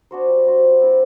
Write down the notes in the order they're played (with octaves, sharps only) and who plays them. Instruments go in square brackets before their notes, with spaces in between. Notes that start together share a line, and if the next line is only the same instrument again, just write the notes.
[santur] D4 F#4 C5
G3
D4 F#4 C5
G3
C4 E4 B4